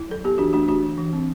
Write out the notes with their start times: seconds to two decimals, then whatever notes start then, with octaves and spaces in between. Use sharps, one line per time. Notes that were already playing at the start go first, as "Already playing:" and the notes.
Already playing: E4
0.09 F#3 A4
0.24 B3 G4
0.38 E3 D4 F#4
0.53 A3 D4 F#4
0.68 A3 D4 F#4
0.83 E3
0.98 E3
1.13 C4